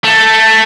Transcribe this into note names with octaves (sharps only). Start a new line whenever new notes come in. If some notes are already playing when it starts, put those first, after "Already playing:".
A3